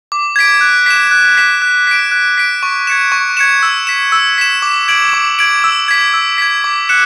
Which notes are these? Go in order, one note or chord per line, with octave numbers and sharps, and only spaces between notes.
D6
G#6 B6 D7
F#6
B6 E7
F#6
B6 E7
F#6
B6 D7
F#6
B6 D7
C#6
G#6 C#7 E7
C#6
G#6 C#7 E7
E6
B6 E7
E6
B6 E7
D6
G#6 D7 F#7
D6
G#6 D7 F#7
E6
G#6 B6
E6
G#6 B6
D6
F#6 C#7 E7